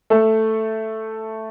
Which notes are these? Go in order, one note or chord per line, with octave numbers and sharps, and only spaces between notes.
A3 A4